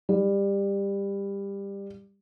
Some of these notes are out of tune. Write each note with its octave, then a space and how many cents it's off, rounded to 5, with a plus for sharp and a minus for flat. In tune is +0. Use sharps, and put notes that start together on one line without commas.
G3 +20